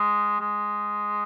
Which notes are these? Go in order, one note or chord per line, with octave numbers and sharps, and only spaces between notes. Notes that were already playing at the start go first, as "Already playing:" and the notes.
Already playing: G#3
G#3